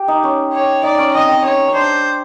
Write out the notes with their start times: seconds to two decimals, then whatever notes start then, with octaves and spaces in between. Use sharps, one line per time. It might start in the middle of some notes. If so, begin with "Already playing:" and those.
Already playing: G4
0.08 D#4
0.23 C#4
0.53 C#5
0.83 D#4 D5
0.98 C#4
1.14 C4 D#5
1.29 C4
1.44 C#4 C#5
1.68 C#4
1.74 D4 C5